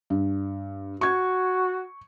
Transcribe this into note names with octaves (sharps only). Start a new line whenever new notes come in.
G2
F#4 C#6 G#6